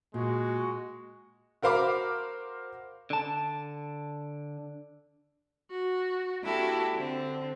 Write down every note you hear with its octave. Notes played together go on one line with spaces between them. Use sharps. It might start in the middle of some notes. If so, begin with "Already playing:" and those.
A#2 G#3 F#4
F#4 A#4 C5 F5 B5 D6
D3 A5
F#4
A#3 D4 E4 F#4 G4 A4
D3 C4